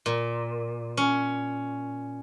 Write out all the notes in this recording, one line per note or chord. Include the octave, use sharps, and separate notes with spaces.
A#2
C#4